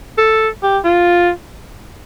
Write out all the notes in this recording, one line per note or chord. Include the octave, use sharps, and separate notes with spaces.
A4
G4
F4